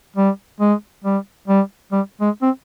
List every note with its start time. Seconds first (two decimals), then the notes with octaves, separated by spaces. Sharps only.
0.16 G3
0.60 G#3
1.04 G3
1.48 G3
1.92 G3
2.21 G#3
2.42 C4